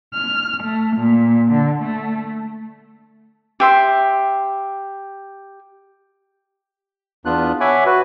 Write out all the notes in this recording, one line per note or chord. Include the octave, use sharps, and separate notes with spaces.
F6
A3
A#2
D3
A3
G4 E5 C6
E2 B3 D4 F4 F#6
C#5 E5 F#5 G#5 B5 D6
F#4 B4